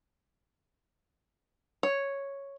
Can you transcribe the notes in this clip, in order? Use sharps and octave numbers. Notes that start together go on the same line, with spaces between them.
C#5